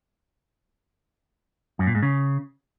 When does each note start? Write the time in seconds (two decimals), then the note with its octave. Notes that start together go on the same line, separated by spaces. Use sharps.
1.79 F#2
1.87 A#2
1.95 G#2
2.02 C#3